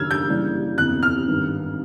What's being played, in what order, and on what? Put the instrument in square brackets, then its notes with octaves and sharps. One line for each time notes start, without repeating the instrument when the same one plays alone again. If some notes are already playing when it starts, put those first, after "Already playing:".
Already playing: [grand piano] F#1 F#2 D#3 [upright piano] E6 F6 G#6
[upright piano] G6
[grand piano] C#3 E3 G3 A#3 D4
[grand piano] G1 F2 C3 E3 [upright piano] F#6
[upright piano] F6
[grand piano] G#1 G2 D#3